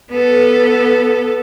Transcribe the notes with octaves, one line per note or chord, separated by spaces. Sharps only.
B3 A4